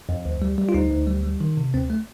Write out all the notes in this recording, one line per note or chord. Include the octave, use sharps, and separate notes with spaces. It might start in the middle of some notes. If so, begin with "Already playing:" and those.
F2
D2
G3
G3
F4
D2 D#4
D2
G3
G3
D#3
C3
D2 C4
A3